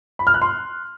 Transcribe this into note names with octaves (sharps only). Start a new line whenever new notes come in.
B5
F6
F#6
C6